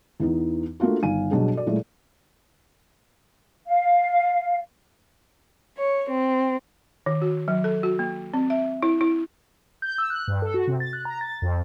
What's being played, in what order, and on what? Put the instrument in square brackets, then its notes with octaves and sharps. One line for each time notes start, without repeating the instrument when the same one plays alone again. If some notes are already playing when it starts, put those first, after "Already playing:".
[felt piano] E2 E3 B3 D#4
A3 A#3 D4 F4 F#4
G1 D#3 F5 G#5 D#7
B2 F#3 G3 B3 D4 G#4
F#4 A4 D5
A#2 F#3 G#3 A3 E4
[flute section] F5
[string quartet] C#5
C4
[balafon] D#3
F#4
F#3
A4
F#4
A#3
C4
E5
E4
E4
[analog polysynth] G6
E6
F#6
G2
A4
F#4
C3
A6
F#6
A#5
A6
F2